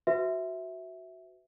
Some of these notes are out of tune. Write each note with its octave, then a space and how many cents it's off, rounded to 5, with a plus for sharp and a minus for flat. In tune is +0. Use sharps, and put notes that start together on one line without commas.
F#4 +0 B4 +30 E5 -5